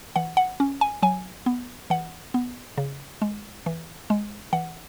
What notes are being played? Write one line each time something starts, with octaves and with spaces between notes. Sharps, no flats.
E3 F#5
F#5
C#4
G#5
F#3 G#5
B3
E3 F#5
B3
C#3
G#3
E3
G#3
E3 F#5